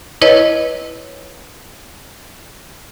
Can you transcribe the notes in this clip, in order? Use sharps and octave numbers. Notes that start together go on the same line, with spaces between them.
E4 B4 C#5 D#5